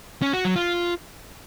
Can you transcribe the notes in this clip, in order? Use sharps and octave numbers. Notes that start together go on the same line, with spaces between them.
C#4
F#4
F#3
F4